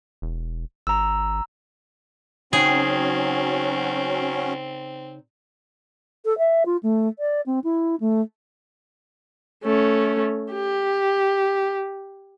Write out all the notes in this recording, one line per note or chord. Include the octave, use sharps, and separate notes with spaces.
E1
G#1 A#5 E6
C#3 F#3 C4 C#4 D#4 G#4 G5
A4
E5
F4
A3
D5
C4
E4
A3
A3 C#4
G4